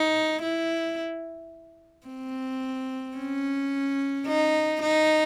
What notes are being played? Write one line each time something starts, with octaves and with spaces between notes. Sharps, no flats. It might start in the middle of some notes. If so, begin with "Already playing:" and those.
Already playing: D#4
E4
C4
C#4
D#4
D#4